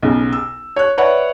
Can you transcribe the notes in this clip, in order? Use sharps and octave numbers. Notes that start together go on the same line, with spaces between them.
B1 C#3
E6
C#5 F#6
B4 C#5 D5 E5 F#5